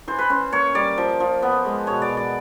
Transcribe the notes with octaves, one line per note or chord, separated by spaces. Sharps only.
E3 C5
B4
C#4 C5
A#3 C#5
G3 D5
F3
F3
B3
G#3
B2 C#5
D5
B2
D5